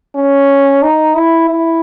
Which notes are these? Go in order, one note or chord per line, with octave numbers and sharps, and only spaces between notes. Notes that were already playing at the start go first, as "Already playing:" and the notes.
C#4
D#4
E4
E4